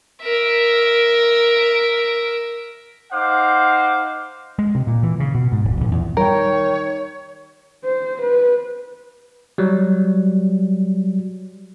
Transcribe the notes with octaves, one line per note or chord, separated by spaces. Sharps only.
A#4 E5
D#4 C5 F5 F#5 D6
G#3
C3
A#2
E3
C#3
B2
G#2
D1
A#1
E2
D#3 G3 A#4 C#5 G5
C5
B4
F#3 G3